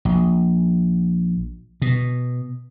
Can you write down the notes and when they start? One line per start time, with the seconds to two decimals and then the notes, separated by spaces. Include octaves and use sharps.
0.05 A#1
1.82 B2